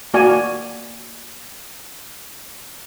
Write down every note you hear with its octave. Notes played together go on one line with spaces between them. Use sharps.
A#3 F#4 D5 G#5